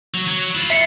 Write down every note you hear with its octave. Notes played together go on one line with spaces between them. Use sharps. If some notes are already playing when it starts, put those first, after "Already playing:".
F#3
F#3
E4 F4
E5 C7 C#7